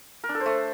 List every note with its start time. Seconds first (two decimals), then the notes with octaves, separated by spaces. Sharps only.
0.24 A#4
0.29 D4
0.35 A4
0.40 C5
0.46 A3